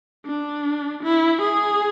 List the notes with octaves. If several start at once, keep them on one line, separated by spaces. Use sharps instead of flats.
D4
E4
G#4